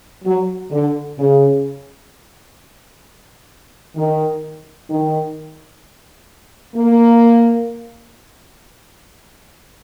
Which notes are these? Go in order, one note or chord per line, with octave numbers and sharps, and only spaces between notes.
F#3
D3
C#3
D#3
D#3
A#3